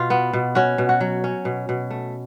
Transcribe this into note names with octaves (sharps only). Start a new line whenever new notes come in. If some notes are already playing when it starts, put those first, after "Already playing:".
Already playing: B2 F4
B3
B2
C#4 F#4
B2
F#4
F#3
C#4
B2
B2
A3